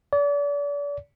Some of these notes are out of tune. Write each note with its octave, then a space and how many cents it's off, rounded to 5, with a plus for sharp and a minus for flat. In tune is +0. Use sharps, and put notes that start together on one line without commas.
D5 -35